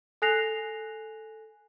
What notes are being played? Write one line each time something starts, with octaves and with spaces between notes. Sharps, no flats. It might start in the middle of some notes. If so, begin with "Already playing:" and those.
A4 G#5 F#6 A#6 C7 F7